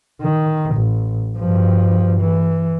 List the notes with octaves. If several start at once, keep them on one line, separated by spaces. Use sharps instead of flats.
D#3
A1
G2 F3
E3